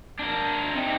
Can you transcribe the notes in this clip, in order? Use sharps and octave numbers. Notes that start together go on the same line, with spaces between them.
D4 A#4
C3 D#4